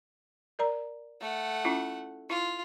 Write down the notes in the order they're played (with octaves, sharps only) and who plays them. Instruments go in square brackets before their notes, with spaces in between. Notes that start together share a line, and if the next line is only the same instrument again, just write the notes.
[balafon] A#4 D5 A#5
[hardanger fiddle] A3 F#5
[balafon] C#4 E4 F4
[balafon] E4 [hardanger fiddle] F4